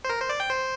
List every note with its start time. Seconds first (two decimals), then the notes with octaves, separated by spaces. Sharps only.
0.05 C5
0.10 A#4
0.20 C5
0.29 D5
0.40 G5
0.50 C5